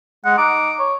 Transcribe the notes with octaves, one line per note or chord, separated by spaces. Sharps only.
G#3 F#5
D#4 D6
C#5